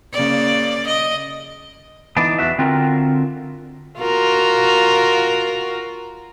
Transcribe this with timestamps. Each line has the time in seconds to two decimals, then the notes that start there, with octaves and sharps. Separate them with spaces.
0.13 C#3 A#3 D5
0.88 D#5
2.17 E3 B3 D4 D#4
2.38 E2 F#4 E5
2.58 D3 C4 F4 F#4 A#4
4.00 F4 F#4 A#4